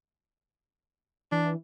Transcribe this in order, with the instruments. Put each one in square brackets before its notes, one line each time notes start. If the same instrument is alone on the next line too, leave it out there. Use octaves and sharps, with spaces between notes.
[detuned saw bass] E3 [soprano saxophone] D4